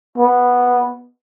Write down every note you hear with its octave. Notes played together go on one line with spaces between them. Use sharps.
B3